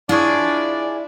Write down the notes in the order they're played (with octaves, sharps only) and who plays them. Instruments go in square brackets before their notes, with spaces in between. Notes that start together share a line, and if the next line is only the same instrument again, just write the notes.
[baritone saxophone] D4 [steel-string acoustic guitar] E4 [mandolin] F4 G#4 C#5 [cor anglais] D5